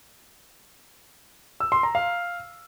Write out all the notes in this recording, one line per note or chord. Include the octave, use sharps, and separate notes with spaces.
E6
C6
A#5
F5